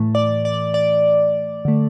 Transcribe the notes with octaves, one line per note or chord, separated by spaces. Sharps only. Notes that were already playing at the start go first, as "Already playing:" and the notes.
Already playing: A2 E3 A3
D5
D5
D5
D3 A3